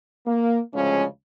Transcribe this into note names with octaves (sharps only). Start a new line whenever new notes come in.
A#3
D2 C#3 F3 G#3 C#4